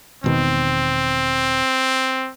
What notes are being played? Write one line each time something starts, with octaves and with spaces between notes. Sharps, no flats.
E1 B2 D#3 C4